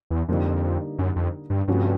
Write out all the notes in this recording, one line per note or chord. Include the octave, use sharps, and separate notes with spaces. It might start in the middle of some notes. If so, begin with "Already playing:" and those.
E2
F2 D3 G3 A#3 D#4
F#2
F2
G2
G2 C3 F3 A3 C#4 F#4